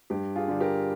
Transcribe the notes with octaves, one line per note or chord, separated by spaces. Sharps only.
G2 G4
F4 G#4
D3 G3
G4 A#4